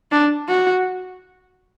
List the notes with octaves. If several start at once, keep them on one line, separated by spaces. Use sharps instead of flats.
D4
F#4